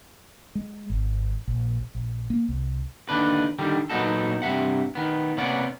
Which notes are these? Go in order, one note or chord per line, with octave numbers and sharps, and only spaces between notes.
G#3
G#1
A#1
A#1
A#3
C2
D#2 D3 D4 B4
D3 D#3 G3
A#2 F#3 B3 D#4 F#4 A4
G2 C3 F#3 E5 F#5
D#3 B3
C3 A#3 B3 C#4 D5 F#5